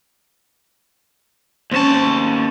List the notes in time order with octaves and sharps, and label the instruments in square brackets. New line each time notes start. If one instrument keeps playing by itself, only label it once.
[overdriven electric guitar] D#2 A5 [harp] C4 C#4